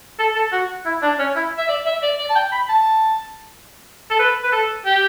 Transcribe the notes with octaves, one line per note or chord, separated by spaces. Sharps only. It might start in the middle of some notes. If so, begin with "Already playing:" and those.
A4
A4
F#4
E4
D4
C#4
E4
E5
D5
E5
D5
D5
A5
G5
B5
A5
A4
B4
B4
A4
G4